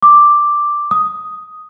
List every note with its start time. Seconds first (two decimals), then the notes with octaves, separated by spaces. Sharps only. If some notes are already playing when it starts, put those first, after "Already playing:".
0.02 D6
0.91 D#6